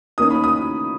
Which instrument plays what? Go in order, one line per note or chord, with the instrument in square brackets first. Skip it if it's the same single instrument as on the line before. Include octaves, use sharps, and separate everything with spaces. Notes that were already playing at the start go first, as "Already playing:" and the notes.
[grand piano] D#3 A#3 C#4 D#6
B5
D#6